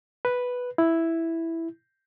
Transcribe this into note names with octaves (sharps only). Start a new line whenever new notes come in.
B4
E4